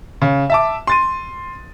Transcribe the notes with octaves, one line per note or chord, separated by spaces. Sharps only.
C#3
E5 A5 D6
C6 A6 D#7